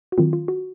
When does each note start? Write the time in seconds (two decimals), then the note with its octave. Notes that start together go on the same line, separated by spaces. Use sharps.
0.12 F#4
0.18 D#3 F#3 C4 F4
0.33 F4
0.48 F#4